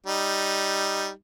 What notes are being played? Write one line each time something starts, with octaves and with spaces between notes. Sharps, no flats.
G3 D#4